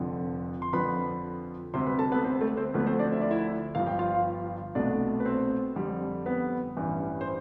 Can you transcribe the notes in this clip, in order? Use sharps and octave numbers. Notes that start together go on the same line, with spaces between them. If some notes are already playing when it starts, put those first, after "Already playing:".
Already playing: F1 F2 D3 F3
C6
F2 D3 F3 B4 B5
D2 C3 G3 C5 C6
B4 B5
A4 A5
B3 B4
C4 C5
A3 A4
C4 C5
D2 D3 F3 A3 B3 B4
C4 C5
D4 D5
E5
D5
E4 E5
G1 G2 F3 F5
G5
F4 F5
C2 B2 A3 D4 D5
B4
C4 C5
F2 D3 G3
B3 B4
A1 G2 E3 G3
C5